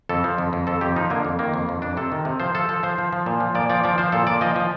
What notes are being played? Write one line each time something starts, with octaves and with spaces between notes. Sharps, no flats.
F2 A4
F3
F2
F2
F2 A4
F2 G4
F3 D#4
D3 A#3
F2
D#3 A#3
F2
F2
F2 D4
C3 A4
D#3
C3
F3 C5
F3 A4
F3 A4
F3 C5
F3
F3
A#2
F3
A#2 D5
F3 D5
F3 D5
F3 C5
A#2 A4
A#2 D5
F3 D#5
F3